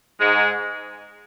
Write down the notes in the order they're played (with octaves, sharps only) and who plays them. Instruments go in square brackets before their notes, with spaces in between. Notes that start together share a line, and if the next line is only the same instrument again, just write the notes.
[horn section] G#2 G#3